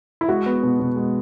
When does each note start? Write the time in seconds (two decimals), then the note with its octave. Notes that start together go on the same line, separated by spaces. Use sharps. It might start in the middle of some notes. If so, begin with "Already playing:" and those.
0.21 E4
0.29 G#3 F#4
0.46 B3
0.63 B2
0.80 B2
0.96 G#3